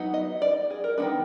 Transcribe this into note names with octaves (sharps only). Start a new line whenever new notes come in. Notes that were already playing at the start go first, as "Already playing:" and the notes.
Already playing: F#3 B3 D#4
D#5
D5
G#4
A#4
D#3 G#3 B3 D4 B4